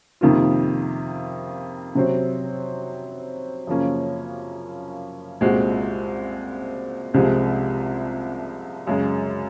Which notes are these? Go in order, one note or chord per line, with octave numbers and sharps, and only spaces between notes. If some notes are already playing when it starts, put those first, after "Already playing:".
F2 C3 D#3 A#3 F4
C3 F#3 C4
F#2 C#3 F3 A#3 C#4
C2 A#2 G#3 C4 F#4
C2 C3 F3 G#3
F#2 C#3 G#3